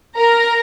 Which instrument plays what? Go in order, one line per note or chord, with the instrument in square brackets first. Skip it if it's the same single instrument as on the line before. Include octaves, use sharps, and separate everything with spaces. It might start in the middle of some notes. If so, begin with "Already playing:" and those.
[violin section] A#4 A#5